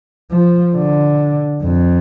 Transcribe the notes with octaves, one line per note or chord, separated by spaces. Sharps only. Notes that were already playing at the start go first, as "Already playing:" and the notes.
F3
D3
F2